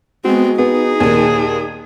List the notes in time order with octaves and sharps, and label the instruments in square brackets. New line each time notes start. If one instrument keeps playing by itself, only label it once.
[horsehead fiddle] G#3 B3 [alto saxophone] C4 [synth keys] F#4
[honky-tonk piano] B3 [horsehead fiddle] D#4 [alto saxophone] G#4
[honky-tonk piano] D#2 A#2 [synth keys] G#6 D#7